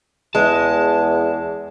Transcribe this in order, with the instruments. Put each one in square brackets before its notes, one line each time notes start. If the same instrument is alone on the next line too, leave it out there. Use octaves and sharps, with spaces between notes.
[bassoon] E2 [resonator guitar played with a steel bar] G#3 [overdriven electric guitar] A5